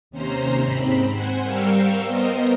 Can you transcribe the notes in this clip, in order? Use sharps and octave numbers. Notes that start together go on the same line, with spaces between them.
D#2 C3 C#4 C5 A#5
G#2 C4 B5
C5 F#5 G#5
G3 A#4 F5 G5 C#6 E6
B3 A#4 C5 D#5